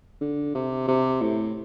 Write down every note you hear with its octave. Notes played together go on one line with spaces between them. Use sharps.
D3
C3
C3
A2